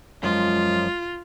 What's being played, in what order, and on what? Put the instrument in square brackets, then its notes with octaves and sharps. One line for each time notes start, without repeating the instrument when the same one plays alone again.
[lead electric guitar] F#2 F3 [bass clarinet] G#3 [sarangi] F4